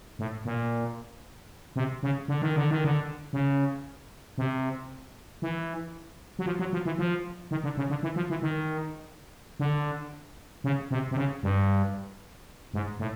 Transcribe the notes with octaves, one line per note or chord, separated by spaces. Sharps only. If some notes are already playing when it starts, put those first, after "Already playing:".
A2
A#2
C3
C#3
D3
D#3
D3
D#3
D3
C#3
C3
E3
F#3
F3
F#3
F3
E3
F3
D#3
D3
C#3
D3
E3
F3
E3
D#3
D3
C#3
C3
C3
C#3
G2
G#2
A2